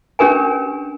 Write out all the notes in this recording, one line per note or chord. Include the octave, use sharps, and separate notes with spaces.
C#4 D4 G4 A#4 B4 G#5